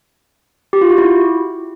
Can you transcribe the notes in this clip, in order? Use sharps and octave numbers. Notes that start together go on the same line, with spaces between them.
G4
F4
F#4
E4